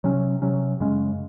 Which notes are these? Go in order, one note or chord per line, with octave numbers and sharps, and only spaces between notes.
C3 F#3 C#4
C3 F#3 C#4
F#2 C#3 G#3 C#4